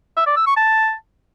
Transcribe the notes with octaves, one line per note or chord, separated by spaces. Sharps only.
E5
D5
E6
C#6
A5